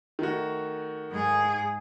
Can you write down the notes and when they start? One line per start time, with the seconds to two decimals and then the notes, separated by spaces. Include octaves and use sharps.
0.19 D#3 A3 F#4
1.10 G#2 G#4